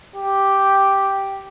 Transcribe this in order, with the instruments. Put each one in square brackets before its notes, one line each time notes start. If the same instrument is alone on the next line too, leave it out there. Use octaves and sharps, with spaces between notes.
[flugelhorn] G4